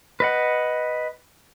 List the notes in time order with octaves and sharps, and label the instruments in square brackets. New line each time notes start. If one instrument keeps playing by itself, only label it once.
[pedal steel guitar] B4 D#5 F#5